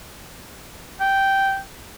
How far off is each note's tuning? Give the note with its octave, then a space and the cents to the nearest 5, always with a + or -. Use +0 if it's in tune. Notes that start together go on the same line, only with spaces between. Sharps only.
G5 -10